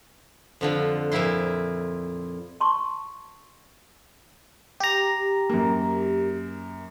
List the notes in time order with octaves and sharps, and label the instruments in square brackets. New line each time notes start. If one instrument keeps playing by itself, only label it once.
[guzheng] F2 D3 F3
F2 A#2 C4 E4 C6
[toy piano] A5 C6 C#6
[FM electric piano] G4 A#5
[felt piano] F#2 A#3